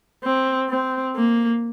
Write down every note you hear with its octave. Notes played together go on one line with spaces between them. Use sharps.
C4
C4
A#3